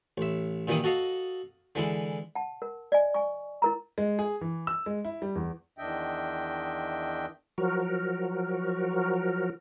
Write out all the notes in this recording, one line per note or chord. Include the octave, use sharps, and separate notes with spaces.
A1 E5
G2 A#2 D#3 E3 E4 D#6
F#4 A4 D#5 F5
D3 E3 G#3 E4
F#5 A5
A#4
D5 D#5 G#5
G#5 C#6
E4 A#4 A#5
G#3
G#4
E3
E6
G#3
E4
G3
E2
E2 D#3 D4 D#5 E5 G5
F3 F#3 F#4 A#4